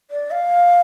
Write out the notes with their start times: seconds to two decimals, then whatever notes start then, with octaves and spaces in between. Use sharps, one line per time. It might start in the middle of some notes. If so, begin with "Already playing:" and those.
0.11 D5
0.31 F5